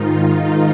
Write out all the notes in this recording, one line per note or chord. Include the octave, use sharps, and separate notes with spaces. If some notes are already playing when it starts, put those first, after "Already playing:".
Already playing: G#2 D#3 D#4 F4